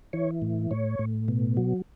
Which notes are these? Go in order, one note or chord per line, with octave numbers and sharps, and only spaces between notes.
E3 C#5
A2
A2 C#5
A2
B2
F#3